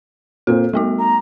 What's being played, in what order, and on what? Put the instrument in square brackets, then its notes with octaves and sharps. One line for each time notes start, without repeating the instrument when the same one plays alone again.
[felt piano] A#2 A#3 C4 [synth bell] A4
[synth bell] G3 B3 F#4 [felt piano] A3
[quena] A#5